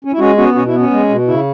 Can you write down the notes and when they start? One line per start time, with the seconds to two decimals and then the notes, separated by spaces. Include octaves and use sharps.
0.05 C#4
0.12 E4
0.18 G#3 C#4 F#4
0.37 B3 C#4 F#4
0.55 B2 C#4 F#4
0.67 E4
0.73 B3
0.79 C#4
0.91 G#3
1.09 B2
1.28 C#3 E4